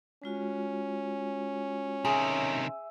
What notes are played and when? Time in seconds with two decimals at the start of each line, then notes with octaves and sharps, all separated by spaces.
0.24 G#3 C#4 F4 F#4
2.05 C3 D#3 G#4 E5 E6